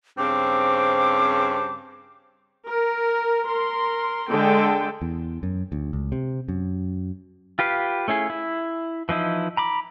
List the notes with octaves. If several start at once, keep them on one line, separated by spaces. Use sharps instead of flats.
G2 C#3 C4 D6
A#4
A#4 C6
D3 G#3 A4 G5
E2
F#2
D2
C#2
C3
F#2
F4 G4 B4 F5
A3 C#4 E4 G#4
E4
E3 F3 D#4 E4
A#5 B5 D6